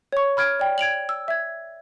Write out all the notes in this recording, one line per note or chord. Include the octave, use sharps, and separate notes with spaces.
C#5 C#6
B5 F6 G#6 D7
D5 G5
G#6 D7 F7 F#7
E6
E5 G#6